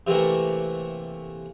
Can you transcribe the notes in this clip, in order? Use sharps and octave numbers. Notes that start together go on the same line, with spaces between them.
C3 E3 A3 A#3